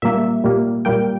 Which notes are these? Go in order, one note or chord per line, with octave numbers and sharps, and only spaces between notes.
A#2 G3 A#3 E5
A#2 G3 A#3
A#2 G3 A#3 G5